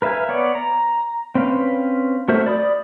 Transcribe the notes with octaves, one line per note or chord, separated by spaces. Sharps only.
A#4 B4 E5 F5 G#5
B3 C#5 D5
A#5
C4 C#4 B4 F5
A3 F#4 A#4 C5 E5
D5 B5 D#6